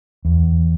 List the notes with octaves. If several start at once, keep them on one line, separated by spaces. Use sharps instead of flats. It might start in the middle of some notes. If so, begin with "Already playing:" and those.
E2